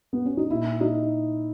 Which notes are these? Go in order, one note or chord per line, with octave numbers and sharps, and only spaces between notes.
B3
C#4
D#4
A#2 E4
D#4